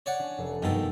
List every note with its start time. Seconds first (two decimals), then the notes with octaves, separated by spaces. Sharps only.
0.06 C#5 D5 F#5
0.19 C#4 D4
0.38 F1 A4
0.62 G2 B2 D#3 G#3 A#3 A4